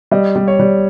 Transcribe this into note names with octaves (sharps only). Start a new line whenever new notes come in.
G3 D#5
G3
C#5
G3